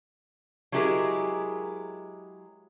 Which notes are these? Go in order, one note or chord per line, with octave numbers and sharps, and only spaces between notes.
F#3 G#3 E4 G4 G#4 A#4